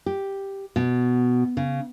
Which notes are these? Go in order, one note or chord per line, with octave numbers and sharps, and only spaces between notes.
G4
B2
C#3